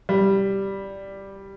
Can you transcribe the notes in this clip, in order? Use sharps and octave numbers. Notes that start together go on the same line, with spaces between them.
G3